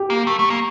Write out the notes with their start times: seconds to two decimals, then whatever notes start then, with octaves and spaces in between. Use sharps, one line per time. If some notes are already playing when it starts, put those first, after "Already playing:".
Already playing: G4
0.10 A#3
0.27 A3
0.39 A3
0.50 A#3